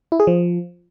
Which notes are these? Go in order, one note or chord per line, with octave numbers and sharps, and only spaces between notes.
E4
G#4
F3